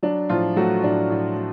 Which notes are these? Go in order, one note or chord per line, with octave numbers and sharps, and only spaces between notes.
F#3 D4
A2 F3 F4
F#3 A3 F#4
A2 D4
A2
F#3